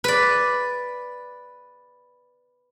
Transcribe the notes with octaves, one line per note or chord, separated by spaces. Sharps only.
B4 D5